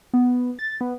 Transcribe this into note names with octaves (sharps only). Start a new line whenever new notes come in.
B3
A6
B3